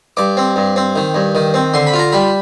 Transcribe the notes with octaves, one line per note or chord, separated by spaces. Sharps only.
G2 D6
C4
G2
C4
D#3
G2
D#3
C4
D3 C6
B5
F4
A#5
G3 B5